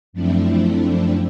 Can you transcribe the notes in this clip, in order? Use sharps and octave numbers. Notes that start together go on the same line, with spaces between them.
F#2 F3 A3 C4 D4 E4